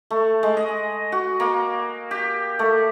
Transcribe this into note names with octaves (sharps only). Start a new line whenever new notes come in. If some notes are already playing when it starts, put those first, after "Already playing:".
A3
G#3
D#5
F#4
A#3
G4
A3